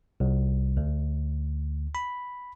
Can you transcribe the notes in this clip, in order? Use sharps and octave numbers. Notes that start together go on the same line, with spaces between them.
C2
D2
B5